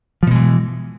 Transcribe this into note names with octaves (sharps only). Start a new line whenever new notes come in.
B2 E3 F3 G#3